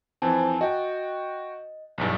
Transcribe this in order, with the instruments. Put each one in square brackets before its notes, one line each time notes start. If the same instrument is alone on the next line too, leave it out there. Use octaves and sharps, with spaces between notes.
[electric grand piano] F2 E3 C4 [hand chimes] G#5 A5
[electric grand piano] F#4 G5 [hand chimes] D#5
[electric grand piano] B1 E2 G2